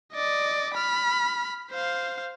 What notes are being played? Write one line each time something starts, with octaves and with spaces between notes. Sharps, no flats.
D5 D#5
B5 F6
C5 F5